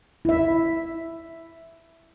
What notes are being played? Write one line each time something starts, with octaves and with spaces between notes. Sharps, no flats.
E4 E5